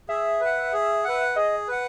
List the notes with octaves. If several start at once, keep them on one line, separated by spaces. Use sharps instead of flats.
G#4 E5
B4
F#5
G#4
B4 F#5
G#4 D#5
B4 F#5